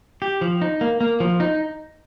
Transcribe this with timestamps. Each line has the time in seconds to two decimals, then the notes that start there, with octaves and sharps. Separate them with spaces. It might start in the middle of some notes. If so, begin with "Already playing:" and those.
0.22 G4
0.41 F3
0.61 D#4
0.81 A#3
1.01 A#3
1.20 F3
1.40 D#4